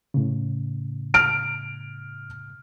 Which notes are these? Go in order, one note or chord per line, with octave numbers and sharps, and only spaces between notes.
A2 C#3
F6 D7